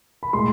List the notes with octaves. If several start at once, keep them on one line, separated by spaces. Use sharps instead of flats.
B5
A2 G#3 C6